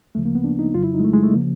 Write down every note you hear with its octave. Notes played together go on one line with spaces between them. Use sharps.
D2 C#3 F3 A3
A#3
B3
D4
D#4
F2 C#3 F#3 F4
E4
D#4
G#3
A3
G#3
A3
C#3 F3 A#3